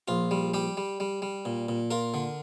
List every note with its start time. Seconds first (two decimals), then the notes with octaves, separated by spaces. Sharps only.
0.08 A#1 F4
0.31 G3
0.54 G3 G4
0.77 G3
1.00 G3
1.22 G3
1.45 A#2
1.69 A#2
1.91 F4 A#4
2.14 D3